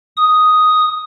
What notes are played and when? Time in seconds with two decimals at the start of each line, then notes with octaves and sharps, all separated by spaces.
0.17 D#6